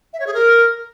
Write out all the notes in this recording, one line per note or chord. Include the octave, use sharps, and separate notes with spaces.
E5
C#5
G#4
A#4